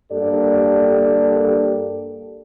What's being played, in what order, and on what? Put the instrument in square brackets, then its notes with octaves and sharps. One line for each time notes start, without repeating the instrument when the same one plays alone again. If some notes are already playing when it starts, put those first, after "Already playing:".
[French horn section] G2 A#3 D4 G4 A4 D5